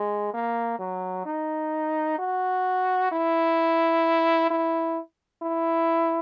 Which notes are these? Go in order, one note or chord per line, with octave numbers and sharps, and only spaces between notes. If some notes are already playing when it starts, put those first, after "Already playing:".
Already playing: G#3
A#3
F#3
D#4
F#4
E4
E4
E4